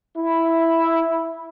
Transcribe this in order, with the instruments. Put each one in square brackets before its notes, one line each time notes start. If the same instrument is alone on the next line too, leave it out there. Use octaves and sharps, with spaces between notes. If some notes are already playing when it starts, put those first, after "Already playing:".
[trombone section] E4